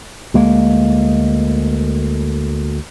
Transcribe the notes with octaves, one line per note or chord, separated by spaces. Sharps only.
D2 G#3 A#3